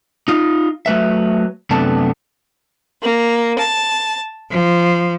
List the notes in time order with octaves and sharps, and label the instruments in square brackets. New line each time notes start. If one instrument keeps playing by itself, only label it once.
[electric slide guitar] D#4 F4
F#3 A3 B4 E5
F#2 C3 A3 B3 D4 A5
[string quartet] A#3
A5
F3